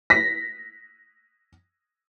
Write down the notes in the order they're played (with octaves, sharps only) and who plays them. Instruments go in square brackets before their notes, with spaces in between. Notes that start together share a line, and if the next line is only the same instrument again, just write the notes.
[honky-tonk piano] A#6 B6